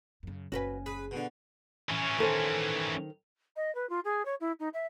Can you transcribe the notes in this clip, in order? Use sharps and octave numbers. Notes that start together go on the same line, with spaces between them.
F#2 C#3
F#1 C#4 F#4 A#4 B4 G#5
G#4 B4
B2 D3
E3 C#4
D#3 A4 C5
D#5
B4
F4
G#4
C#5
E4
D#4
E5